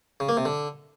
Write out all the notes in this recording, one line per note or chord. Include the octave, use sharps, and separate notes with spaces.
C#3
A#3
C3
D3